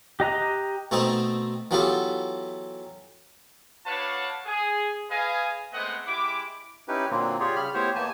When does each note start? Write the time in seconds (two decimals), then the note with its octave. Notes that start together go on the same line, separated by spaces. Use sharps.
0.20 G4 D#5 A#5 F#6
0.91 B2 A3 C4 D#4 A5
1.71 E3 F#3 B3 F4 G4 A4
3.86 D4 F#4 B4 C#5 F5 A5
4.46 G#4
5.10 G#4 B4 D#5 F5 G#5
5.73 G#3 A3 B3 C4 D#5 F#5
6.07 G#3 E4 G4 D6
6.88 C#4 D#4 E4 G4 B4
7.10 A#2 D3 F#3 A#3 C4
7.40 F4 G4 G#4 C#5 D5
7.55 C#3 G3 B5 F6
7.74 A3 B3 E4 G4 C5 C#5
7.95 E2 E3 A#3 G#5 A5